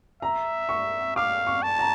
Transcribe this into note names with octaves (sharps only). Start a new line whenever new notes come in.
E5 A#5
C#6
F5 D6
C#6
A5
A#5